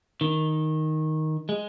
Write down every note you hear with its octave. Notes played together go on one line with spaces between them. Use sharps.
D#3
G#3